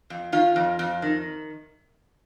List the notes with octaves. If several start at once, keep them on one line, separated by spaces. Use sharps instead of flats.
F2
D#3 F4
F2
F2
D#3